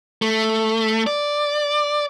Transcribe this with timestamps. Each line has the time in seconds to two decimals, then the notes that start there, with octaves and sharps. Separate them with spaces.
0.22 A3
1.07 D5